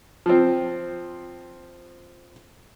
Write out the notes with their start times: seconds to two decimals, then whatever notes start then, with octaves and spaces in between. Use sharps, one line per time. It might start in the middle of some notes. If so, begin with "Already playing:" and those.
0.26 F3 C4